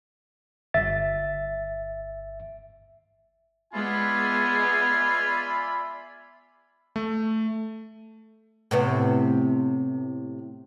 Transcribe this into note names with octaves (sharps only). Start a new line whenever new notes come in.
G1 E5 A6
G#3 B3 F4 D5 E5 G#5 B5
A3
A2 C3 B3